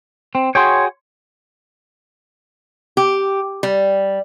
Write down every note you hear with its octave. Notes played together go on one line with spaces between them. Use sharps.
C4
F#4 G#4 C#5 G5 C6
G4
G3